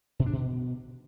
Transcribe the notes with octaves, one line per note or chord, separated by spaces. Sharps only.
B2
D4
B2